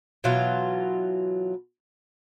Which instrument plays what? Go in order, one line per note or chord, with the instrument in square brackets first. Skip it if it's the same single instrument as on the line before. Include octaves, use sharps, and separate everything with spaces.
[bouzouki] B2 E3 F#3 F4